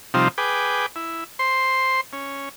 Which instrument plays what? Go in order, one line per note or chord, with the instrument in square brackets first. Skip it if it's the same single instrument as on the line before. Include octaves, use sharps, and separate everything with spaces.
[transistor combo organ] C3 F3 G3 C4 D#4 F4
G#4 B4 G5 D6
E4
C5 C6
C#4